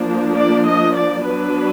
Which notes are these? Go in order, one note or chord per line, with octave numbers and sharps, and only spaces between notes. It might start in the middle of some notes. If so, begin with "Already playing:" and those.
Already playing: F3 A#3 D4
D5
D#5
D5
F#3 B3 D4 B4